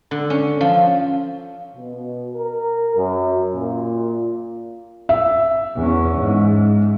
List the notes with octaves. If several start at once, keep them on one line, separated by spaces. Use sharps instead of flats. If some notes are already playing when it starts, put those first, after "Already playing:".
D3
C#4
F3
B2
A#4
F#2
A#2
E5
E2 C#4
G#2